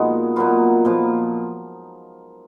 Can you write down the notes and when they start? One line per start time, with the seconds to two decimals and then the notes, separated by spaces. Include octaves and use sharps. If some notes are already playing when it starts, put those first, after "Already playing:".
Already playing: A#2 G#3 B3 D#4 F#4
0.36 A#2 F#3 B3 F4
0.85 A#2 F3 B3